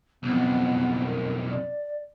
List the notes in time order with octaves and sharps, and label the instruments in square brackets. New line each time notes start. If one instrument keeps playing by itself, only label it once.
[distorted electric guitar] B1 F2 [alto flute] B3
[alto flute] A#4
D5